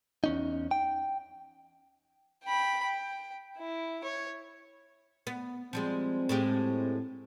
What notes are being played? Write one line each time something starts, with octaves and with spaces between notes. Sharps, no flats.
E2 C#4 D#4
G5
G5 B5
G5
E4
C#5
B3
F3 G3 G#3 C4
A2 G#3 G4